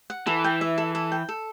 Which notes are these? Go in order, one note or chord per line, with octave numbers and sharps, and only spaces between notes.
F#5
E3 A4
G5
E5
A4
A4
G5
A4